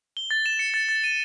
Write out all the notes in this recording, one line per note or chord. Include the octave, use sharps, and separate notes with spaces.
G7
A6
E7
C#7
A6
A6
D#7